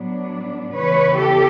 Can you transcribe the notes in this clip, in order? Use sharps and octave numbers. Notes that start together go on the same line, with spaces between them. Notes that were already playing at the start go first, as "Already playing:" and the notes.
Already playing: A2 F#3 B3 D4
E2 C#3 E3 B4 C#5
G4 A4